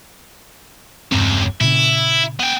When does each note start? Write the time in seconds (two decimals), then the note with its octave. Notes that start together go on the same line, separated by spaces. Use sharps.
1.12 E1 C#2 G2 C3 C4
1.61 A#2 C#3 E4
2.40 B3 G5